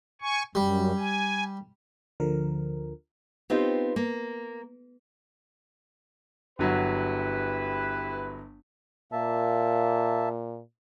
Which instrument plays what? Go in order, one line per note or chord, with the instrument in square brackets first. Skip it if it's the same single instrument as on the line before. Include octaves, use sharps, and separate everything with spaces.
[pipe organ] G#5 C#6
[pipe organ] F#2 [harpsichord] G3
[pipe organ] G#5
[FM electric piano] D2 D3 F3 A#4
[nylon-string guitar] B3 C4 D#4 F4 G4 C5
A#3
[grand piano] G1 F#3 [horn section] E4 G4 B4
[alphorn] A#2 [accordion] A#3 E5 A5